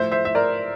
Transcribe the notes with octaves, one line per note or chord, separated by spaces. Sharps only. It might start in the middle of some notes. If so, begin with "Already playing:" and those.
Already playing: A2 F3 C5 E5
C5 E5
E5
A#4 D5